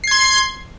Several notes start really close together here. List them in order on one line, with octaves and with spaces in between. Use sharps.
C7 G#6 C6